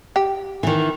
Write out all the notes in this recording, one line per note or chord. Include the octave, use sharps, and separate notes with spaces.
G4
D#3 E3